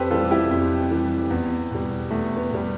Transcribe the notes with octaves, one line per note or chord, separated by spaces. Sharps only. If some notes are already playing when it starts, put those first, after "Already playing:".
Already playing: F2 G4 A4 B4 C5
E3 G3 F4 A4
E4 G4
F2
E3 G3
E2
B2 G3
E2 A3
B3
B2 G3